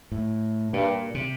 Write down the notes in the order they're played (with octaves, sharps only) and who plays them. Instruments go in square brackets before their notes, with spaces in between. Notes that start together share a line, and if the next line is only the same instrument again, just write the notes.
[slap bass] A2
[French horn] G2 [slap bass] A#2
[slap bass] C3